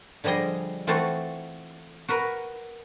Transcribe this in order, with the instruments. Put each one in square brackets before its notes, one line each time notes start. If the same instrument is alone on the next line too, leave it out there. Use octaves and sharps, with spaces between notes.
[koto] D3 F3 G3 G#4 D#5
E3 A3 C4 F4 F#4 A4
F#4 A#4 B4